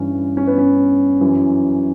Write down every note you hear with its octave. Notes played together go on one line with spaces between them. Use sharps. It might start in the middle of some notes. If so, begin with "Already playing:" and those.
Already playing: G2 E3 C#4
C#4
B3
C#4
F#2 E3